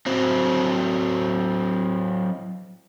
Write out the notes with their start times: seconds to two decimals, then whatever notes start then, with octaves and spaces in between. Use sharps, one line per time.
0.07 F#3 C4